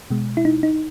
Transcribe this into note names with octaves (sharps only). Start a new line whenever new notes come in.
B2 G#3
E4
D#4
D#4